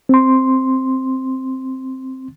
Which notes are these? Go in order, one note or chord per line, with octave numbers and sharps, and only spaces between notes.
C4 C6